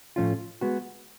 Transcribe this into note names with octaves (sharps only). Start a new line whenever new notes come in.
A2 F3 A3 C#4 F4
G#3 B3 F#4